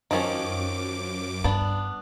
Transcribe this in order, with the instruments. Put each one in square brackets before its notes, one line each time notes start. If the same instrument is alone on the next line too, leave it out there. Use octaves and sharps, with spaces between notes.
[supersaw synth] F#2 D6 [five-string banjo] D#3 F3 C#4
[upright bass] G2 [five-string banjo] B3 D4